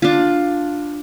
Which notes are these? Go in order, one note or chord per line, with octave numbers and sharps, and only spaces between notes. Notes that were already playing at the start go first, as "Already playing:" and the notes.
D4 F4